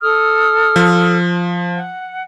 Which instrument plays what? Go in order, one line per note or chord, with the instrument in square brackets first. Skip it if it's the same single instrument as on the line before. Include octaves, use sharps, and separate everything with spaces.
[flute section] A4 D#6 F6
[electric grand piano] F3
[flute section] F#5